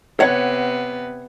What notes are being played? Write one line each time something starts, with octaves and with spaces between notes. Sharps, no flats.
C3 B3 C#5 F#5